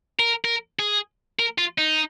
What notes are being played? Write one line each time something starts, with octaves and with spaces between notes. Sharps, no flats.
A#4
A#4
G#4
A#4
F4
D#4